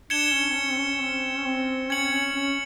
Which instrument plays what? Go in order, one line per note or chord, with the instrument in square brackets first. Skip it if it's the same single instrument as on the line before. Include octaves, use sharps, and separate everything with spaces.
[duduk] D4 [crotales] G#6 C#7 E7 G7
[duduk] C#4
C4
C#4
C4
C#4
C4
C#4
C4
[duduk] C#4 [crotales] G#6 C#7 F#7
[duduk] C#4
C#4